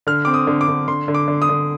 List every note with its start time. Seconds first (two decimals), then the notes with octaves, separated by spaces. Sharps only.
0.07 D3 F6
0.25 C4 D6
0.34 D#6
0.47 D3
0.61 D6
0.68 D3
0.87 D3 C6
1.08 D3
1.15 D6
1.28 D3
1.42 D#6
1.49 D3